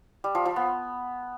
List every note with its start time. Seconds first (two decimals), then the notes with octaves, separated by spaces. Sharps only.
0.24 G3
0.35 F3
0.45 F3
0.56 B3